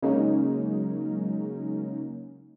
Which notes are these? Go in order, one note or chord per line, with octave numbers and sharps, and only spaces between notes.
C#3 F#3 G#3 A#3 C#4 D#4